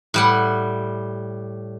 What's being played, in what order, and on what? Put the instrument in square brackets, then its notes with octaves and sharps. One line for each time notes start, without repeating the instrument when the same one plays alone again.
[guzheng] A2 G3 F#5